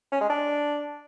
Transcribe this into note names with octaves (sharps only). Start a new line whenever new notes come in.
C#4
G#3
D4